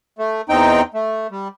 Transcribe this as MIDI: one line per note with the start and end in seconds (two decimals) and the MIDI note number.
0.19 0.41 57
0.49 0.82 40
0.49 0.82 60
0.49 0.82 63
0.49 0.82 79
0.94 1.27 57
1.31 1.48 55